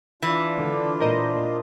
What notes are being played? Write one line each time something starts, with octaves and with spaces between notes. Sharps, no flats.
E3 D4 F4
D3
A#2 A#4 C5 D#5